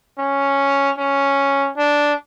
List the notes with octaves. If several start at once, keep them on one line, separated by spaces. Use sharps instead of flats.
C#4
C#4
D4